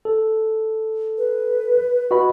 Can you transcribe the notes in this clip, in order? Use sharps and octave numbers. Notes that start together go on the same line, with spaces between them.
A4
B4
F#4 D#5 B5